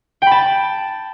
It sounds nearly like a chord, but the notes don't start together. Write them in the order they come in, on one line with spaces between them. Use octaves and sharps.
G5 B5 A5